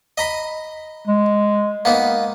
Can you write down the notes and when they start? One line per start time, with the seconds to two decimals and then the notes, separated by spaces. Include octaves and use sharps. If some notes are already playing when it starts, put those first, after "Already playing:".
0.18 D#5 A#5 B5
1.07 G#3
1.85 A#3 B3 D#4